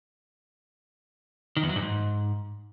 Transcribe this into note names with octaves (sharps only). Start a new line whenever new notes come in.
D#3
E2
F#3
G2
G#2